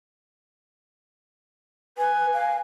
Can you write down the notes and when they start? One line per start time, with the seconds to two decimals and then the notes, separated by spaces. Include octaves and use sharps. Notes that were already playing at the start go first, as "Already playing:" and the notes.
1.98 B4 G#5
2.33 F5